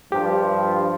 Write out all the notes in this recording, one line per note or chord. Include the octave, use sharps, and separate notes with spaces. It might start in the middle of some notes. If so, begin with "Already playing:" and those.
G2 F3 G4